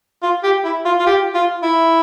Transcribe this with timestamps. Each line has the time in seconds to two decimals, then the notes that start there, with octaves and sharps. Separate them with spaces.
0.23 F4
0.44 G4
0.64 E4
0.85 F4
0.99 F4
1.07 G4
1.35 F4
1.63 E4